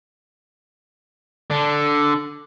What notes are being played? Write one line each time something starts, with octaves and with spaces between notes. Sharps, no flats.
D3 D4